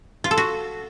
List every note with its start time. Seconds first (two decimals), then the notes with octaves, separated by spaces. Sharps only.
0.24 F4
0.31 A4
0.37 F#4